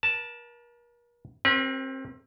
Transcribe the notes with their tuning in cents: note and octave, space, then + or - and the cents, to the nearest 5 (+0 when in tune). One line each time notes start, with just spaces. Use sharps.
A#4 +40 A5 +0
C4 +30 G4 +0 B4 -40